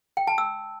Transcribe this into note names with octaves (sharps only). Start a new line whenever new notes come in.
G5
A5
E6